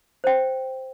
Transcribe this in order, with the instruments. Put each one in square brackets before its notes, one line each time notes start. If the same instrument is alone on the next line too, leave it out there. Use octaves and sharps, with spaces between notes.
[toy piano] C5 G5